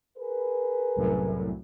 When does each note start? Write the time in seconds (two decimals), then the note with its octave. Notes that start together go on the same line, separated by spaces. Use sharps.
0.17 G#4 A#4 B4
0.96 C2 F#2 A2